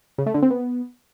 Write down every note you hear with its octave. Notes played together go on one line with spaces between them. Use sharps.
C#3
A3
D3
C4
B3